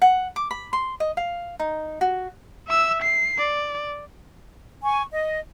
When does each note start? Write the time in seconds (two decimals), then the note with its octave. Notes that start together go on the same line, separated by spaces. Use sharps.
0.02 F#5
0.36 D6
0.51 B5
0.73 C6
1.00 D#5
1.17 F5
1.60 D#4
2.01 F#4
2.68 E5 E6
3.03 C7
3.38 D5
4.82 G#5 C#6
5.12 D#5